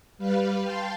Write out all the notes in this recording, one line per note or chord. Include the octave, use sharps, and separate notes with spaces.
G3 B4 F5
F5 G5 A5 C6